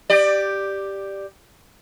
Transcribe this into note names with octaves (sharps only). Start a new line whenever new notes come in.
G4 D5